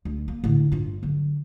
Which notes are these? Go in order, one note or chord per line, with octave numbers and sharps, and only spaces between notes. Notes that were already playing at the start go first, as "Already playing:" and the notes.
D2
A#3
A2 D3
G2 F4
D3 F#3